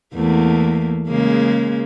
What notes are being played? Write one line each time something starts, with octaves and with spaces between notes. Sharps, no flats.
E2 A3 A#3
C#3 G#3 A#3